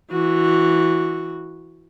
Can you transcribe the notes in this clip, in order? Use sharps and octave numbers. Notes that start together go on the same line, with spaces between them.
E3 F#4